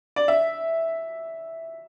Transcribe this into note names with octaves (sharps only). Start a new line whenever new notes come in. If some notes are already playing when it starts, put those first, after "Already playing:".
D5
E5